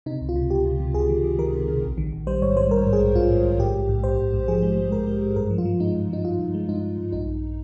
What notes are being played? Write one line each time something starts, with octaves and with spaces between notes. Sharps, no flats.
C3 D#4
C#2
F4
C3
C#2 G4
C3
C3
C#2 G#4
D#3
D#3
D#3 A#4
C3
C3
A#1
D#3
A#1
G3 C5
G#2 C#5
G3 C5
G#2 A#4
G#2
G#4
A#1
A#1 F4
G#2
A#1
G#2 G4
A#1
G#2
A#1 C5
A#1
G#2
F3 G#4
G#3
G#3
G#2 A#4
G#3
G#2
G2 A#4
F3
F4
F3
G#3 D#4
G2
F3 D#4
G2 F4
G2
G#3
G2 D#4
G2
G2
A#1 D#4
A#1